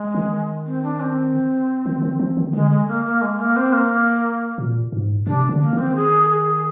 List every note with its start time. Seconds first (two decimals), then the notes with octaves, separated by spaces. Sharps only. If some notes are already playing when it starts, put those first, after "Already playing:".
Already playing: G#3
0.15 D#3
0.66 C4
0.83 D4
1.00 C4
1.86 D#3
2.02 D#3
2.19 F3
2.37 D#3
2.53 D3 G#3
2.71 G#3
2.88 A#3
3.05 A#3
3.22 G#3
3.39 A#3
3.56 C4
3.73 A#3
4.58 A#2
4.92 G#2
5.27 C3 D4
5.49 D3
5.61 A#3
5.73 D#3 C4
5.96 G#4
6.29 G#4